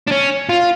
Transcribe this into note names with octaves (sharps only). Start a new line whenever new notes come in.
D4
C#4
F4